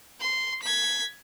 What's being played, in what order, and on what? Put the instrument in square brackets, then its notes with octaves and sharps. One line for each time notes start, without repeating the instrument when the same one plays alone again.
[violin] C6
G#6 B6